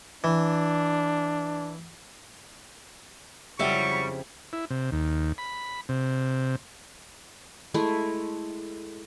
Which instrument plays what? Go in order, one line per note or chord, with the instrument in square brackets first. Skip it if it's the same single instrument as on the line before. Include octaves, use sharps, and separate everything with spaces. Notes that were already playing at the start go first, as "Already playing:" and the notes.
[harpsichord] E3 [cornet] D4
[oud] F2 C#3 E4 [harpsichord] F#3 D6 [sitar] G3 [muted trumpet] C#6
[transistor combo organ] E4
C3
D#2
B5
C3
[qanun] G#3 A3 E4